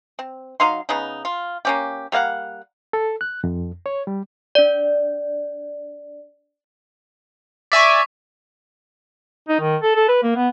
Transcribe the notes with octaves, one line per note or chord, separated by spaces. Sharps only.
C4
F#3 D#4 F5 C6
C#3 B3 D#4
F4
A#3 C#4 G4
G3 A#3 F5 F#5
A4
F#6
F2
C#5
G3
D4 D5
D5 E5 G#5 C#6 D6 B6
D#4
D#3
A4
A4
B4
A#3
B3